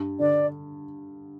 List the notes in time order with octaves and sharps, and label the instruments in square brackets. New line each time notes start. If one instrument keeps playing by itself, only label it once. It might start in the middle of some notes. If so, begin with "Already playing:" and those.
Already playing: [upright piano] G2
[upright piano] D3 [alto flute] D5